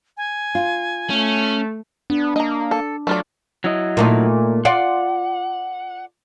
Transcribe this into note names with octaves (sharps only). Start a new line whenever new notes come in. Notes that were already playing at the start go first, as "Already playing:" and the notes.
G#5
F4
A3 C#4
B3 D4
A#3 D#5 A#5
A4
F#3 A3 F4 D5
F#3 E4 D#5
A#2 A3 D#4
F4 D5 F#5